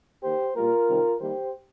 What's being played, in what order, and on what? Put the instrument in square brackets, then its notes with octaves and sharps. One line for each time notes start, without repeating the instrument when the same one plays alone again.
[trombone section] D#3 A#3 G4 C5
A#2 G3 A#3 F4 A#4
C3 D#3 G3 C4
D#3 G3 A#3 G4 C5